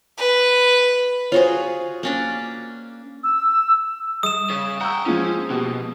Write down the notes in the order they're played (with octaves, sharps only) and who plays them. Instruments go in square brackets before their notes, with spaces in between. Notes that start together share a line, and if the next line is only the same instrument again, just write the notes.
[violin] B4
[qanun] F4 F#4 G#4 [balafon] C5 C#5
[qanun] A#3 C#4 D4
[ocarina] E6
[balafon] G3 G#4 [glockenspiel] D#6 E7
[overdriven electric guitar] C#4 G#4 [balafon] C#5
[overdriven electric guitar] F#5 G5 [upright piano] A#5 C#6 E6
[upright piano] F3 G#3 F4 [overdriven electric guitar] C#4
[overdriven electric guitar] B2 [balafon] A#3 G4